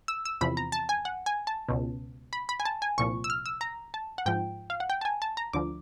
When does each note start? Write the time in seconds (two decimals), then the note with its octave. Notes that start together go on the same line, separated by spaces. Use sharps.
0.08 E6
0.25 E6
0.41 E2 C3 F3 B5
0.57 A#5
0.72 A5
0.89 G#5
1.05 F#5
1.26 G#5
1.47 A5
1.69 C#2 B2
2.33 B5
2.49 B5
2.60 G#5
2.65 A5
2.82 G#5
2.98 C2 A#2 F3 C#6
3.24 E6
3.30 F6
3.46 E6
3.61 A#5
3.94 A5
4.18 F#5
4.26 G#2 F3 G5
4.70 F5
4.80 F#5
4.90 G5
5.01 A5
5.05 G#5
5.22 A5
5.37 A#5
5.53 D2 D3 F3 D6